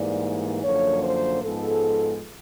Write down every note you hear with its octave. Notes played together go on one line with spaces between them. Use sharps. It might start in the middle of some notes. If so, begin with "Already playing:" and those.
Already playing: G#2 E3 G3 A#3 D5
F#2 D3 F3 A#3 C#5
C5
G#2 F3 G#3 B3 A4